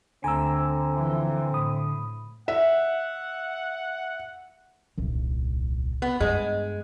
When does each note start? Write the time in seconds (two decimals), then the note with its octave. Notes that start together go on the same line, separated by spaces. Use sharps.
0.24 D2 D3 C4 G#5 A#5 E6
0.94 E3 F3
1.54 A2 B5 D#6
2.48 E5 F#5
4.98 D#1 C2
6.02 B3
6.20 G2 G#3